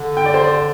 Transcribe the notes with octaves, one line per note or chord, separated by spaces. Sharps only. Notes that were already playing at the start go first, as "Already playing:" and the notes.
Already playing: D3
G5
D5
C5
D5